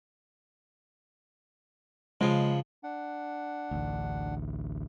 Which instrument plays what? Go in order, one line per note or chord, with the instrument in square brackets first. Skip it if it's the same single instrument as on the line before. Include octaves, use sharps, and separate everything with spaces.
[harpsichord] C#3 F3 [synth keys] G#3
[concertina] D4 F#5
[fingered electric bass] A1 D2